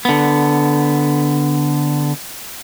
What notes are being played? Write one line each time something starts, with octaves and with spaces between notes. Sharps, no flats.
D3 B3